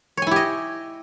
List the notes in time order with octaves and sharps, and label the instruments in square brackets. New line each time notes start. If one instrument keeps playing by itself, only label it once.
[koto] C#5
G#5
E4
G4
D#5